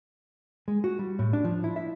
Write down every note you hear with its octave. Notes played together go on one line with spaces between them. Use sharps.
G#3
F#4
G3
A2
D4
F3
E4
E5